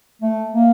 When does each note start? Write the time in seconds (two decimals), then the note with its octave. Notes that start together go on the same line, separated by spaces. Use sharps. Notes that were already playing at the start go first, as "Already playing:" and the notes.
0.22 A3
0.52 A#3